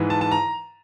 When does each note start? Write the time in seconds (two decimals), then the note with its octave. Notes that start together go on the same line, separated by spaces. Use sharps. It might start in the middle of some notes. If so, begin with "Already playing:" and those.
Already playing: G#2 E3
0.10 A5
0.21 A5
0.32 A#5